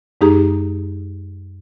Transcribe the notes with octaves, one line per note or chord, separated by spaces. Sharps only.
F#2 G#3 D#4 G4 G#4 A#5